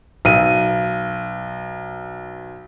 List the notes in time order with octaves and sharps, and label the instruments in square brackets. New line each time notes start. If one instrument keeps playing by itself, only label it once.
[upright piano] B1 D#7